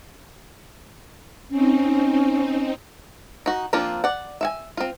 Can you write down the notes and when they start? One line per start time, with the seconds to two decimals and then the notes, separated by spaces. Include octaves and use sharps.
1.50 C4 C#4 D#4
3.46 D#4 F#4
3.73 F3 A#3 C4 D4 F4
4.04 D5 F#5
4.41 E5 F5 G#5
4.77 C4 F4